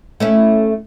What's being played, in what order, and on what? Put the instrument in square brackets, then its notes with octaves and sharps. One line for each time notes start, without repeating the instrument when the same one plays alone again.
[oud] A3 C#4 E4